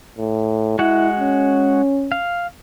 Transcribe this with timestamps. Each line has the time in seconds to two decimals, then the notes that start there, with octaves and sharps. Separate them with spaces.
0.18 A2
0.79 G#3 E4 F#4 F#5
1.19 C#4
2.12 F5